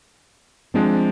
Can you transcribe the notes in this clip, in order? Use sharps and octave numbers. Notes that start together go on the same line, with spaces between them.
F3 G#3 C4 D4